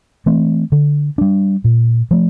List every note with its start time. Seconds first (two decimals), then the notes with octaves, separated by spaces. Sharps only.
0.26 E3 A3 C4
0.72 D3
1.18 G3 D4
1.64 A#2
2.11 F3 A3